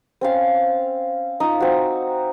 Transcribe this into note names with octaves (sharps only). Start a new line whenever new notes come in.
C4 C#4 F5
D#4 F4
C4 F#4